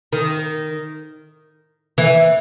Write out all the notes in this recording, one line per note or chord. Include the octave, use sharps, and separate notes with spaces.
D#3
E3